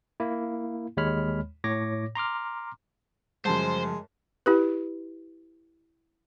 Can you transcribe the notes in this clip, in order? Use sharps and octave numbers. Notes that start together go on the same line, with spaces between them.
A#3 E4
D#2 G#3 C#5 B5 F6
A2 C#5 D6 A#6
A#5 C6 D6 F6
F#2 C#3 F3 G3 G#3 C5 A5
E4 G4 B4